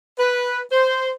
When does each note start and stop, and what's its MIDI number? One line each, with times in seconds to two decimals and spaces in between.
0.19 0.61 71
0.71 1.11 72